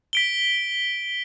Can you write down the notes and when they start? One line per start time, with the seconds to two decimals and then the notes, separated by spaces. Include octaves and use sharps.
0.13 B6 D7 G7